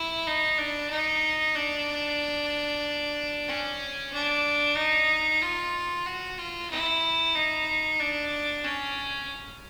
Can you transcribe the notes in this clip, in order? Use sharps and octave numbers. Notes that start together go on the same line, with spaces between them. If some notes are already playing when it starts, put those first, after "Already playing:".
Already playing: E4
D#4
D4
D#4
D4
C#4
D4
D#4
F4
F#4
F4
E4
D#4
D4
C#4